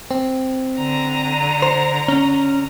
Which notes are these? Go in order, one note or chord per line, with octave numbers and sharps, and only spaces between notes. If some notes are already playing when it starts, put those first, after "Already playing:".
C4
D3 A#5
C5
C#4